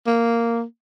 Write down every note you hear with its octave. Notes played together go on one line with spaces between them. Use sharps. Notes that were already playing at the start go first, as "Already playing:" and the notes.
A#3